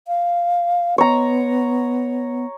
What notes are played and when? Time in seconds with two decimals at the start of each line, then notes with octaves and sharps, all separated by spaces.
0.08 F5
0.98 B3 C#5 A#5